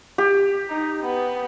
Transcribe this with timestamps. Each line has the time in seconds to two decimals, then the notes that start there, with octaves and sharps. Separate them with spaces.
0.18 G4
0.69 D#4
1.02 B3